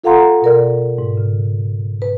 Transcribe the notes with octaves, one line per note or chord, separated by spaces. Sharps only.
F4 A4 F5 F#5 A#5 C6
B2 A#4 D5
G#2
C#3
B4